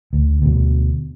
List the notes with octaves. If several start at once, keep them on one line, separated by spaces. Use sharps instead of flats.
D2
D2 B2